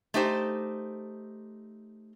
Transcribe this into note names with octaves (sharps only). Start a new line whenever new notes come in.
A3 D#4 G4 C5